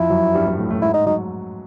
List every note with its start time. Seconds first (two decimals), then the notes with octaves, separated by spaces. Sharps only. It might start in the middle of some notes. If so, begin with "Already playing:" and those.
Already playing: F2 F3 E4
0.10 F#2 F#3
0.34 G2 G3
0.47 G2 G3
0.58 A2 A3
0.70 A2 A3
0.82 G#2 G#3 E4
0.94 D#4
1.06 F#3 D#4